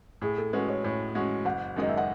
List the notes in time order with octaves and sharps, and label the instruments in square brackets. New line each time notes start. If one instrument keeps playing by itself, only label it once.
[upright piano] A2 [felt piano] G#4
[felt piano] A4
[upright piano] G#3 C#4 F#4 [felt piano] B4
[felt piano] C#5
[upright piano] A2 [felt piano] C#5
[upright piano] G#3 C#4 F#4
[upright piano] F#1 [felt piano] F#5
[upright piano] F#2 D#3 G#3 [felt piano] D#5
[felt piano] E5
F#5